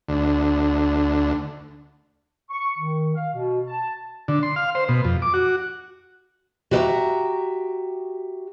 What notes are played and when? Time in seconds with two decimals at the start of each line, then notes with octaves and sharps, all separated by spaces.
0.08 D2
2.50 C#6
2.78 D#3
3.14 F5
3.34 B2
3.67 A5
4.28 D3
4.43 C6
4.56 F5
4.75 C5
4.89 B2
5.05 F2
5.22 D6
5.34 F#4
6.71 F#4 G4 B4 D#5 E5 A#5